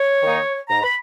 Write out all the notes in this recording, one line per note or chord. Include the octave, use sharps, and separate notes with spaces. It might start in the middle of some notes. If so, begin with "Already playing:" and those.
Already playing: C#5
D#3 A#3 D#4
G#2 A#5
B5